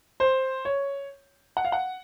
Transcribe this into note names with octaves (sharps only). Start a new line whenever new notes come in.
C5
C#5
F#5
F5
F#5